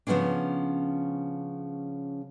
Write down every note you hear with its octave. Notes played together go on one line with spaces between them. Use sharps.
C#3 F3 A3 B3 C#4 D4